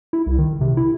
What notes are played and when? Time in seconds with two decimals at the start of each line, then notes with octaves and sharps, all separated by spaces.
0.13 E4
0.26 C2
0.39 D#3
0.61 C3
0.77 E4